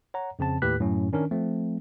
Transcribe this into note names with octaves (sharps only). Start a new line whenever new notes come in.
C#5 F#5 A#5
F2 C#3 C4 A5
D#2 A2 G4 B4 F#6 B6
F#2 A2 F#3 C#4
D#3 C#4 D4 A#4
F3 A3 C4